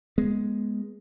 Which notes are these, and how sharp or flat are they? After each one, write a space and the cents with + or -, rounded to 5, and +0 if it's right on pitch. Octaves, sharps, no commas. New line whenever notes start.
G#3 +0 B3 -20